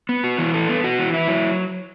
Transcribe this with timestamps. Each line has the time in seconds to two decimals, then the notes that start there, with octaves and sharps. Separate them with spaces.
0.09 B3
0.24 F#4
0.38 E3
0.54 A4
0.69 B3
0.84 F#4
0.99 E3
1.14 E4
1.28 F#3